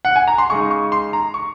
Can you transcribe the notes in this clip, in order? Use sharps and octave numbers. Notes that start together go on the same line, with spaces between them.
F#5
G#5
A#5
C6
C#3 G#3 D#4 C#6
C#6
C6
A#5
C#6